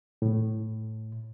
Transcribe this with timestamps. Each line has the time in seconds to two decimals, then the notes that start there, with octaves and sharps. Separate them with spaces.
0.22 A2